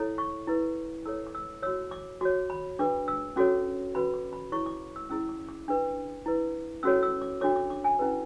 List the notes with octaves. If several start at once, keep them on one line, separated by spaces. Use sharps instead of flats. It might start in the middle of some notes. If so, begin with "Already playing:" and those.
Already playing: E4 A4 C#5
C#6
E4 B4
E4 A4 C#5 E6
D6
E6
F#4 C#5 E6
D6
F#4 C#5 D6
B5
D4 G#4 B4 D6
E6
C#4 F#4 A4 C#5 D6
C#4 F#4 B4 B5
D6
B5
E4 G#4 C#5 C#6
D6
E6
C#4 E4 G#4 E6
D6
D6
D4 G#4 B4
E4 B4
C#4 F#4 A4 C#5 E6
E6
D6
D4 F#4 A4 C#5 D6
D6
D6
G#5
C#4 E4 G#4 B4